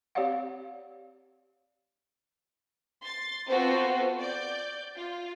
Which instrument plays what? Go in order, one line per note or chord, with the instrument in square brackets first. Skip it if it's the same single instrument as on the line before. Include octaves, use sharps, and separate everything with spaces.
[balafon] C4 G4 C#5 D5 F5 F#5
[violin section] C6 A6
B3 C4 F4 F#4 A4 C5
D5 G6
F4